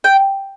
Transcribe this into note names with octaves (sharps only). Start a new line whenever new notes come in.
G5